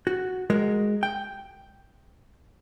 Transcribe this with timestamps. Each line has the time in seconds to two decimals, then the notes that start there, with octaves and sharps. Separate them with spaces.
0.07 F#4
0.50 G#3 F#4 A#4
1.03 G5